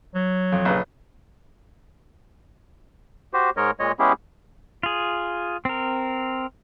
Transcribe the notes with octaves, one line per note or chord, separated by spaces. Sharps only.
F#3
F2
A#1 C#3 B4
F#4 G4 C5
G#2 G#3 A#4 C#5 D#5
A#2 G#3 C#5 D#5
G#3 B3 C#4 E4 G4 G#4
F4 G#4
C4 A#4